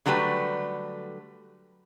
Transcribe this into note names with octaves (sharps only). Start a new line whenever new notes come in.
D3 F#3 G3 A3 B4